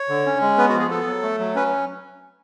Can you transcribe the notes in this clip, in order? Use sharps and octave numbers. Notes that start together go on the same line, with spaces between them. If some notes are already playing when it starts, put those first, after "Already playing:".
Already playing: C#5
D3
C#4
G#3
B3 B4
F#4
F3
G#4
B3 A4
F#3
A3
F#3
C#4 B4